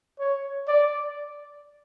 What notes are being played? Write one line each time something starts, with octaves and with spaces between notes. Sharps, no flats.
C#5
D5